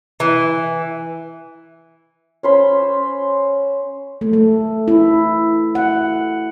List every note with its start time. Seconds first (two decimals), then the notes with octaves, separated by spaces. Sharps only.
0.20 E3
2.43 C#4 C5 B5
4.21 A3
4.33 A3
4.88 E4
5.75 F#5